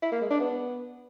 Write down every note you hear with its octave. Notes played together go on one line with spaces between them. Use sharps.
E4
A#3
G#3
D4
B3